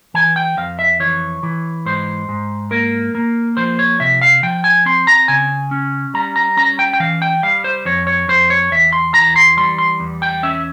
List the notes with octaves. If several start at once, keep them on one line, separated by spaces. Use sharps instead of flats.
E3 G#5
G5
F2 F5
E5
E3 C#5
E3
G#2 C5
G#2
A#3 A#4
A#3
F3 C5
C#5
C3 E5
F5
F3 G5
G#5
C4 C6
A#5
C#3 G#5
C#4
G3 A#5
A#5
C#4 A#5
G5
G5
E3 F5
G5
G3 F5
C5
F2 C#5
C#5
F2 C5
C#5
E2 E5
C6
E3 A#5
C6
G3 C6
C6
E2
G5
C#4 E5